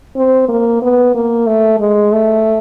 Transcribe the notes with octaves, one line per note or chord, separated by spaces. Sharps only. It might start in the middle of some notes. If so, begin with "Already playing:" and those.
C4
A#3
B3
A#3
A3
G#3
A3